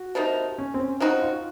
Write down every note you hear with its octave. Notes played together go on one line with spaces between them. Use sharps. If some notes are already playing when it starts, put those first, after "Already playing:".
Already playing: F#4
C3 F3 A#3 D#4
C#4
C4
C#4
F3 C4 D#4 F#4
F4